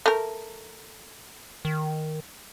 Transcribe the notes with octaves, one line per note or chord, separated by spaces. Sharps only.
A3 A#4
D#3